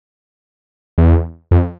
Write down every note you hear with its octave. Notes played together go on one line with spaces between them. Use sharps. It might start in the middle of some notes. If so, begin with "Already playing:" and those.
E2
F2